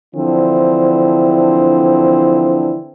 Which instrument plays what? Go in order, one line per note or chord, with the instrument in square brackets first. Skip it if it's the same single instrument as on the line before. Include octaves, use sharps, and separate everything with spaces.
[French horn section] D3 E3 F3 C4 D4 E4